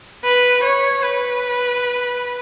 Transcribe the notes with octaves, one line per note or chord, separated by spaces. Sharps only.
B4
C#5
B4